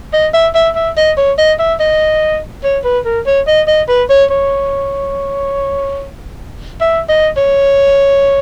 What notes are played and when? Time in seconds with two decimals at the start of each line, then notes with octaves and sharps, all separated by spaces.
0.13 D#5
0.34 E5
0.55 E5
0.75 E5
0.97 D#5
1.17 C#5
1.38 D#5
1.59 E5
1.80 D#5
2.64 C#5
2.84 B4
3.05 A#4
3.26 C#5
3.47 D#5
3.67 D#5
3.88 B4
4.10 C#5
4.31 C#5
6.81 E5
7.09 D#5
7.37 C#5